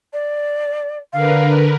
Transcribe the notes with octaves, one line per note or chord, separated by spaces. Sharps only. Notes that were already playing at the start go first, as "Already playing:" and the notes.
D5
D3 A#4 B4 F5